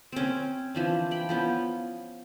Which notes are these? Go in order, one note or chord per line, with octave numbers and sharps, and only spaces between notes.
C4 C#4
E3 F3 D4
G5 B5
F3 B3 C#4